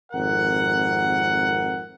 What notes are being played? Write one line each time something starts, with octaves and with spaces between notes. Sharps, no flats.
G#1 F2 A#4 F#5